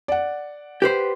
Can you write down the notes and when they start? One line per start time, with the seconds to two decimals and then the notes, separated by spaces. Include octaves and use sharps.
0.08 D5 F#5
0.82 G4 B4 C5